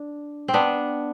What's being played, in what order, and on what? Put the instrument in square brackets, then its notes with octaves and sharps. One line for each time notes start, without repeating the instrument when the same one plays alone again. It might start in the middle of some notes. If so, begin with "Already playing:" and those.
Already playing: [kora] D4
C4
B3 D4